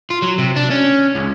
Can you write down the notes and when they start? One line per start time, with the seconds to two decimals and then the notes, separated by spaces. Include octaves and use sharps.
0.10 F4
0.22 F#3
0.38 C3
0.56 D4
0.70 C#4
1.15 C#2